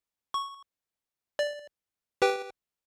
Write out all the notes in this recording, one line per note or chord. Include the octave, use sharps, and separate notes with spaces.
C#6
D5
G4 B4 G5